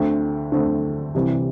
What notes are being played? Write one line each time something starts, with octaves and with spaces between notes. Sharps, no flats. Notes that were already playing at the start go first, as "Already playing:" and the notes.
Already playing: D2 D3 A3 C4 G5
D2 D3 A3 C4
C2 C3 E3 G3 C4